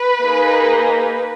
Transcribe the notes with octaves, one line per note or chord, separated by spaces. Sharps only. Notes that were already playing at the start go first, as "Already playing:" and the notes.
Already playing: B4
A#3 D#4 G#4